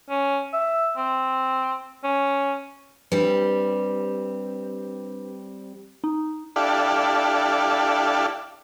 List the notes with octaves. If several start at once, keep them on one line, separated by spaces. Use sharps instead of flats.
C#4
E5
C4
C#4
G3 C4 D4 G4 B4
D#4
D4 E4 G4 A4 D5 F5